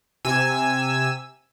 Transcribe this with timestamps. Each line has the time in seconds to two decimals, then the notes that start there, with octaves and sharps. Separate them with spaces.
0.25 C3 G#5 E6